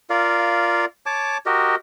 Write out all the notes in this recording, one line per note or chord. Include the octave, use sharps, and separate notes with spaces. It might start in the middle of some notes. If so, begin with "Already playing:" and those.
F4 A#4 D5 F5
C#5 A5 D6
F#4 G4 A#4 D#5